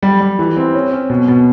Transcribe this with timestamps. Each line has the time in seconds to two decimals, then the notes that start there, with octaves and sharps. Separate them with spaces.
0.03 G3
0.21 G3
0.39 E3
0.57 C4
0.74 C#4
0.92 C#4
1.10 B2
1.28 B2